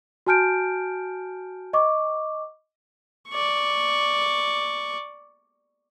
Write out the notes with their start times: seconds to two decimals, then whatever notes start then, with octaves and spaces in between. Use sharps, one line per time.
0.27 F#4 G#5 A5 F6 G6 D7
1.73 D#5 C#6 D6
3.29 D5 C#6